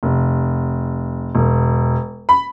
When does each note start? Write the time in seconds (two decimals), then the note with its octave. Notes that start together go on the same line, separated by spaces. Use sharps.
0.03 F1
1.35 E1
2.29 B5